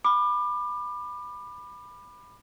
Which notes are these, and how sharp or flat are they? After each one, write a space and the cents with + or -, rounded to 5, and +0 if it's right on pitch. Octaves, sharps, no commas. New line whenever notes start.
B5 +0 D6 +30